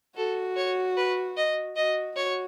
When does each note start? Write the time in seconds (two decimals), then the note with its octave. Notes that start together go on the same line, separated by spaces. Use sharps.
0.16 F#4 A4
0.57 C#5
0.97 B4
1.37 D#5
1.76 F#4 D#5
2.17 F#4 C#5